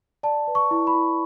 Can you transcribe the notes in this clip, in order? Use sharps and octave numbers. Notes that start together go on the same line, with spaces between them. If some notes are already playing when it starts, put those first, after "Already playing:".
D5 A5
B4
C#6
E4
B5
E4